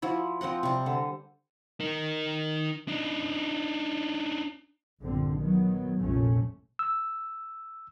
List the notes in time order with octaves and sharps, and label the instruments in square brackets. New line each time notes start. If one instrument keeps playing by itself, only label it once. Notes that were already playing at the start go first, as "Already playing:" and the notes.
[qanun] F3 E4 F#4
F3 C4 D#5 F#5
C3 G3
D3
[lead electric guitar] D#4 A#4
D4 D#4
[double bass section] A#1 G2 D3 C4
D#3 F#3 B3
F1 A#1 F2 A#2 A3 C#4
[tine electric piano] E6